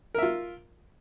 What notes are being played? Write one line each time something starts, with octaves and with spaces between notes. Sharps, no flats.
F4 A#4 E5